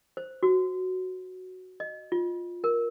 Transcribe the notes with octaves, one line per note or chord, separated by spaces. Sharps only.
C5
F#4
D#5
F4
A#4